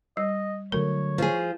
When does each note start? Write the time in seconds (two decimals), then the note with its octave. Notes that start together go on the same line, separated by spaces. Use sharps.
0.17 G3 D#5
0.72 D3 F#3 A3 A#4 C#5
1.18 F3 G#4